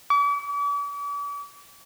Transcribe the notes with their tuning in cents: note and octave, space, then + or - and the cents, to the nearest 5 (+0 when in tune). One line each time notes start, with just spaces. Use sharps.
D6 -45